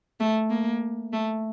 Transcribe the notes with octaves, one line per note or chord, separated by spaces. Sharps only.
A3
A#3
A3